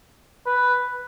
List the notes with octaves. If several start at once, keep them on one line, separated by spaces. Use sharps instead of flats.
B4